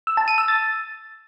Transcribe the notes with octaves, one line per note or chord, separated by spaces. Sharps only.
E6
A5
D#7
E6
A6